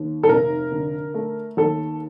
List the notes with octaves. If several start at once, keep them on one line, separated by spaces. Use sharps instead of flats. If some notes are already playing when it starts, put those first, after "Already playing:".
Already playing: D#2
A4
F1 A#4
D3
A3
D#2 A4